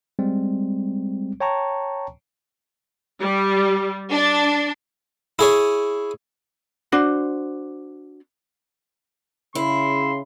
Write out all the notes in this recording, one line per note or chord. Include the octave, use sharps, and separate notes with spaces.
G3 G#3 C4
C#5 G5 A5 A#5 C#6
G3
D4
E4 G#4 C#5
D4 F#4 C5
C#3 E4 C6